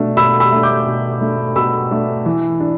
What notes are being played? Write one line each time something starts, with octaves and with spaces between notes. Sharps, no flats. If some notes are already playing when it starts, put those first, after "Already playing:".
Already playing: B2 A3 D4
B2 B5 E6
B5 E6
A3 D4
D6 G6
B2
A3 D4
B2 B5 E6
A3 D4
E3
D4